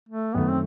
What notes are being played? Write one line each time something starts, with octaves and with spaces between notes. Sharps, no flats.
A3
F#2 D#3 A3 B3
C4